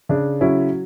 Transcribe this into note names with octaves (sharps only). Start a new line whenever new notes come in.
C#3 D4
F#3 C#4 E4